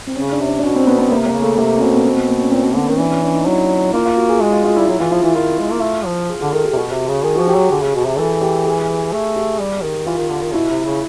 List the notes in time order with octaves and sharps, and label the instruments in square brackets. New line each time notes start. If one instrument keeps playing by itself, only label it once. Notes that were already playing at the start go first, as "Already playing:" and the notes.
[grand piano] C4
[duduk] C#3 [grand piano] C#4
[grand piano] D4
[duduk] C3
[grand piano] D4
D4
[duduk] B2 [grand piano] C#4
[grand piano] C4
[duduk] B2 [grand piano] B3
[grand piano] B3
[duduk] C3 [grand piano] A#3
[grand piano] A#3
[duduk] C#3
[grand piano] A3
[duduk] C3 [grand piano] A#3
[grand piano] C#4
[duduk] B2 [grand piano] C4
[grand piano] B3
[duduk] B2 [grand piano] C4
[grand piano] B3
A#3
C#4
[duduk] A#2 [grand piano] C4
[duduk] B2 [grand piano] C4
[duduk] D3 [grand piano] B3
[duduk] D#3 [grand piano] C#4
[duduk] E3 [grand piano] D4
[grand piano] C#4
D4
D#4
[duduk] F#3 [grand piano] E4
[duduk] A#3 [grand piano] F4
[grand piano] F4
F#4
G#4
[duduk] G#3 [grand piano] G#4
[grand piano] F4
[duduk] G#3 [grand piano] F4
[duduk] G3 [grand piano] E4
[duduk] F#3 [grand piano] E4
[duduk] E3 [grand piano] F4
[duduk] F3 [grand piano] F4
[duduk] E3 [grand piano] E4
[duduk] D#3 [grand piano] F4
[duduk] G#3
A#3
A3
F3
[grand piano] G#4
[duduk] D3 [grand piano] G#4
[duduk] D#3 [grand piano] A4
[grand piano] G4
[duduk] C3
[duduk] B2 [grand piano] F#4
[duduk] C3
C#3
[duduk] D#3 [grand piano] G#4
[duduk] F3 [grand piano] F#4
[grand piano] G4
[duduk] F#3
[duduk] D3 [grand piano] G#4
[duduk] C#3
B2
C3
[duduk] E3 [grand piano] A4
[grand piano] G4
G#4
[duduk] A3 [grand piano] G#4
[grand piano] G4
[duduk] G3
D#3
[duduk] E3 [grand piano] F4
[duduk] D#3
D3
D#3
[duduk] B2 [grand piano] E4
[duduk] C3
C#3